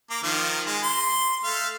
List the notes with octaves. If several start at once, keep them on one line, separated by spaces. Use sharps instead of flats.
A#3 D6
D#3 F3 F4
G#3
C6
A3 F5